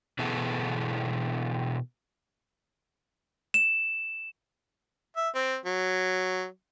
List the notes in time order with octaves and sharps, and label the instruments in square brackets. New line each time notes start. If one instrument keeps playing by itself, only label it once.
[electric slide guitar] B2 E3 B3 E4 G#4 A4
[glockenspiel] E7
[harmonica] E5
C4
F#3